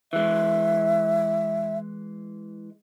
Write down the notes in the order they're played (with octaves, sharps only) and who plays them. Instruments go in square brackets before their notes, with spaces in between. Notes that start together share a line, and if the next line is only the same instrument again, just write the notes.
[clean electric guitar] E3 G#3 [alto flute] E5